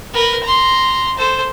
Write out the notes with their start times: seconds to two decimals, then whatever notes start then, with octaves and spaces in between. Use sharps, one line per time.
0.13 A#4 B4
0.43 A#5 C6
1.18 A4 C5